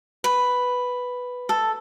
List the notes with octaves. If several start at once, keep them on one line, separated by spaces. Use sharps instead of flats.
B4
A4